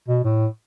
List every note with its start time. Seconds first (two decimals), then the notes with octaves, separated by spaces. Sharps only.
0.08 B2
0.24 A2